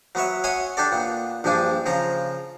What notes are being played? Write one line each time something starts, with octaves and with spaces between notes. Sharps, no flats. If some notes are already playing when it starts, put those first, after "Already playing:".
F#3 B3 B4 C#5 E5
C#5 E5 F#5 G#5 C6 D#6
D4 G4 A4 D5
A#2 B3
A#1 G2 F3 D4 G#5
C#3 F3 F4 A#5